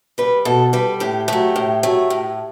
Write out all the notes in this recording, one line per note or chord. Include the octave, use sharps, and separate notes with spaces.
G3 B4
B2 A4
G3 B4
A2 G4
F#3 A3 G4
A2
F#3 A3
A2